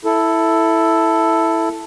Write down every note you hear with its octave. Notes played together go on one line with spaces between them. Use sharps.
E4 A4